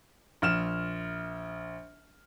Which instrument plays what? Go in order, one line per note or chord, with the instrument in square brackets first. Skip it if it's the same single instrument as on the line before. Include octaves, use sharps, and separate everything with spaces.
[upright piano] A#1 F6 E7